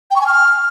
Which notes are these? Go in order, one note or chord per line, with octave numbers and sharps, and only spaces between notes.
G5
C#6
G#5
F6